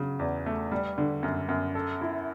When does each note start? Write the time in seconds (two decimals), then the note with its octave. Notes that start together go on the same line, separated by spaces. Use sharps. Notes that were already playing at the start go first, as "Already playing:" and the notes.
Already playing: C#3 F#3
0.19 E2
0.46 A3
0.72 G3
0.98 D3
1.23 F#2
1.49 F#2
1.75 A4
2.01 E4